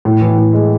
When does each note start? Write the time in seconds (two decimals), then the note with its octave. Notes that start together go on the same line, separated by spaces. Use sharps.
0.05 A2
0.21 E3
0.38 A2
0.53 G#3